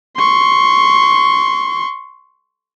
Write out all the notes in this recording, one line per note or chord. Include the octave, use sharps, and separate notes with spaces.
C6 C#6